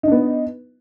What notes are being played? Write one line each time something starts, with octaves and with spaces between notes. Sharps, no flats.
B3 D4 D#4